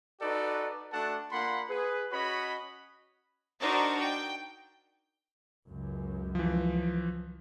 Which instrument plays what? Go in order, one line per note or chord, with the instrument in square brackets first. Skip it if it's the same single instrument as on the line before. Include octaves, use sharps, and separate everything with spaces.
[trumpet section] D#4 F#4 A4 B4 D5
A3 D4 F#4 A4 F#5 A5
A#3 D4 F4 F#5 B5 C6
G#4 B4
C#4 F#4 C#5 D#5 B5
[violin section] D4 D#4 F#4 A#4 C5
G5
[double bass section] C#2 F#2
[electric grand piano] E3 F3